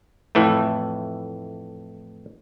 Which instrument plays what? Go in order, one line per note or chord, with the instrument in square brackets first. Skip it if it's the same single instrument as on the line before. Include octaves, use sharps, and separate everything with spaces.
[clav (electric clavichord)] F2 A2 E3 A3